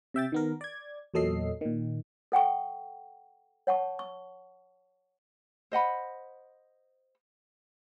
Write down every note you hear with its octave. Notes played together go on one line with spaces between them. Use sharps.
C3 E5 G5 A6
D#3 B3 A#4
D5 G#6
E2 A#2 F#3 A4 D#5 C7
A#2 D#3
A4 F#5 G5 C#6
C#5 F#5 A5 C#6
C#6
C5 D#5 F#5 B5